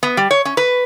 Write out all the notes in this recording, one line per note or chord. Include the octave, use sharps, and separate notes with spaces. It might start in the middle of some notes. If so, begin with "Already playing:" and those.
B3
G3
C#5
C#4
B4